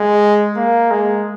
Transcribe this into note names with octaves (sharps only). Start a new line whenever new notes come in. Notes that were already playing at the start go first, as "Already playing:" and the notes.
Already playing: G#3
A#3
G#3